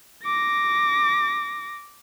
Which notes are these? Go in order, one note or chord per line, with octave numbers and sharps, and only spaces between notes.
D6 A#6